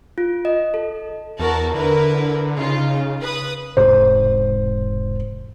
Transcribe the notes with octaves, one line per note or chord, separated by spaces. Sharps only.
F4
D#5
A4
E2 F#4 A#4 A5
D3 E4 A#4 B4
C#3 D#4 F4
B4 D#6
E1 G#2 C3 C5